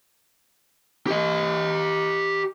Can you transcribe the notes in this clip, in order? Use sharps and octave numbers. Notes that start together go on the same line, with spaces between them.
G4 D#5